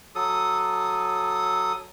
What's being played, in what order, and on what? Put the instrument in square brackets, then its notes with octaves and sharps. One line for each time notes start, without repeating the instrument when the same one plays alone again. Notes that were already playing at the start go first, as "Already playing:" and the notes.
[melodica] F#3 A4 D#6